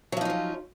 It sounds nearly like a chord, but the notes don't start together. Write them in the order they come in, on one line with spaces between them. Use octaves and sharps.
F#3 F3 D#4 F4 C#4